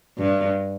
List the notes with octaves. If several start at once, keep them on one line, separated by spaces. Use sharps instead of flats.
G2